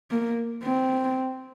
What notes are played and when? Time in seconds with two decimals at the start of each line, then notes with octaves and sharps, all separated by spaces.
0.11 A#3
0.64 C4